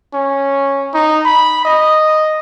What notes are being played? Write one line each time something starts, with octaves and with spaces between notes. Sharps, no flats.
C#4
D#4
B5
D#5